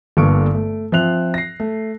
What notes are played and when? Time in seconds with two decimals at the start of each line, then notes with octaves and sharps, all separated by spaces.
0.17 G1 G2 D3 A#3 C#6 D7
0.54 A3
0.92 F3 C4 E5 F#6 F7
1.34 A#6 C7
1.60 A3